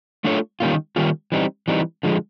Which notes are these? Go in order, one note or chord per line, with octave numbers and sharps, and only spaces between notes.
A3 D4 F4 A4 C#5
D#3 G3 A#3 C#4 F4
D#3 G3 A#3 C#4 F4
E3 G3 C4 D#4
E3 G3 C4 D#4
D3 F3 G#3